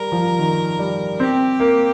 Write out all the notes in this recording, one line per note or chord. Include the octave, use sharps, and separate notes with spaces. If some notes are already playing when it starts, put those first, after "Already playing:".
Already playing: G3 A#4
F3
D#3
G3
C4 G4
A#3